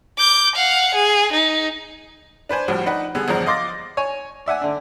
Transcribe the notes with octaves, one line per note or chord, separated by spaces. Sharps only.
D6 G6
F5 F#5
G#4
D#4
D4 B4 C5 G#5
D2 A2 D3 F3 G3
D4 D#4 B4 F#5
D3 G3 B3 G#4
G1 E2 C#3 F3 D4 A#5
D#5 F5 C6 D6 A6 A#6
C#5 G#5
D5 E5 F#5 G#5
D3 D4